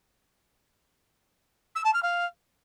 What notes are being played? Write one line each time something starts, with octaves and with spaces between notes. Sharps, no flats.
E6
A5
F6
F5